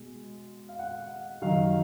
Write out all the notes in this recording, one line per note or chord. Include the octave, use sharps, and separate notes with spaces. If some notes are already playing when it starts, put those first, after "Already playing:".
Already playing: B2 G#3
F5
F#5
F#2 D#3 F#3 F5